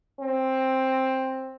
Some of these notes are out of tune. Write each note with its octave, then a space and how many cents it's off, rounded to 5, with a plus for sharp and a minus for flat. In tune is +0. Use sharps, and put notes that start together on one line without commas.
C4 +10